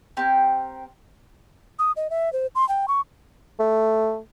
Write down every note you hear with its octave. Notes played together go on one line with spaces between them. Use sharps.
C4 G4 A#4
D#6
D#5
E5
C5
C6
G5
C#6
A3